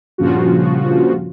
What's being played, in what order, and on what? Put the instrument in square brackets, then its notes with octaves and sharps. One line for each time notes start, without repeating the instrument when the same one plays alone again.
[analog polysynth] G2 A#2 C#3 F3 F4 F#4